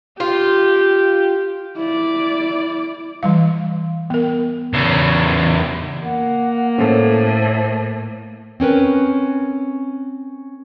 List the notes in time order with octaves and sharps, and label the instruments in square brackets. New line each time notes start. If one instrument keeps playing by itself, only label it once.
[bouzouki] F4 [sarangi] G4
[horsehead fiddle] E4 D5
[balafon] E3 G3 F5
B3 A#4
[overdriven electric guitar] E2 C#3
[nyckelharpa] A#3 [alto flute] F#5
[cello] A2 [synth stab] C#4 A4 [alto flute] C5
[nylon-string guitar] C4 C#4 A#4 B4